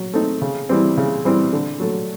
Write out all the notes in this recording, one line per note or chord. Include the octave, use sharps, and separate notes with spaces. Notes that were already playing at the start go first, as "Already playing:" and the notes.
Already playing: F#3
A3 C4 D#4
C#3
E3 G3 C4
C#3
E3 G3 C4
D3
F#3 A3